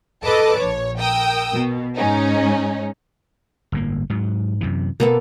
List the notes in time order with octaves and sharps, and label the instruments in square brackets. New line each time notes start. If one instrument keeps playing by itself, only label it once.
[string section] A4 B4 D#5 A5 D6
A#1 C#5
A#4 G5 D#6 E6
B2
G#2 C#4 D#4
[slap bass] G1 A2 A#3
G#2 F#3
F#2 C3 E3
[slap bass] B2 [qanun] A#3 B3 A4